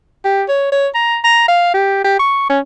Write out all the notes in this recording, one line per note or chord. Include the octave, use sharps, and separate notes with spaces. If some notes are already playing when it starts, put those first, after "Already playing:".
G4
C#5
C#5
A#5
A#5
F5
G4
G4
C#6
C#4